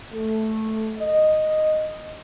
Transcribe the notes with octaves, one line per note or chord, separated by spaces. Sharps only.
A3
D#5